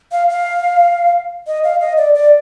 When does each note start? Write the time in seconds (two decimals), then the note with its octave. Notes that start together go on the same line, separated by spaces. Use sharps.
0.12 F5
0.29 F5
1.47 D#5
1.64 F5
1.81 D#5
1.97 D5
2.15 D5